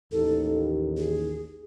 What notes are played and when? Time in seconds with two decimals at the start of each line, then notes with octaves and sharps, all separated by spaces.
0.12 A1 D#2 A4
0.97 G#4